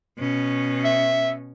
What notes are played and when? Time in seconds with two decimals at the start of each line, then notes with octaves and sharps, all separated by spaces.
0.19 B2 C#4
0.84 E5